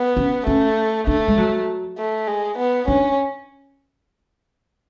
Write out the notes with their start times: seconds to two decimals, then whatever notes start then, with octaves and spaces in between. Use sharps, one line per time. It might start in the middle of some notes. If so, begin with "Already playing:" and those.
Already playing: B3
0.17 C#4
0.47 A3 C#4
1.07 A3 D4
1.28 G#3
1.37 F#3
1.98 A3
2.27 G#3
2.58 B3
2.88 C#4 D4